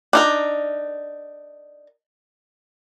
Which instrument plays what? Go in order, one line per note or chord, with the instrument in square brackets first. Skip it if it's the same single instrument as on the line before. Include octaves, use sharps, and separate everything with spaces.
[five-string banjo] D4 D#4 A#4